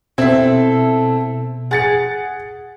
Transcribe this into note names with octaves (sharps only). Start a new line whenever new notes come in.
B2 C4 E4 A4 E5
G#4 F#5 A6 C#7